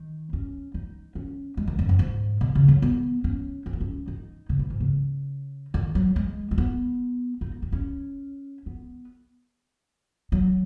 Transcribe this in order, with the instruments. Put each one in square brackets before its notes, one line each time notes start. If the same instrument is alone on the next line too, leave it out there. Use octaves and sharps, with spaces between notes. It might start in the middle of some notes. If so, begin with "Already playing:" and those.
Already playing: [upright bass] D#3
C#4
D#4
C#4
G#3
D#3
F#2
G#2
G#2
B2
C#3
F#3
B3
C#4
C#4
B3
C#4
D#4
C#3
B2
G#2
C#3
D#3
F#3
G#3
G#3
B3
D#4
B3
C#4
B3
F#3